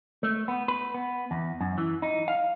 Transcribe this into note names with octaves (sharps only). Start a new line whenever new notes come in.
A3
B3
B4
B3
E2
F#2
E3
D#4
F5